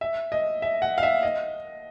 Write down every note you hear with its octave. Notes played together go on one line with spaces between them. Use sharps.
E5
D#5
E5
F#5
F5
E5
D#5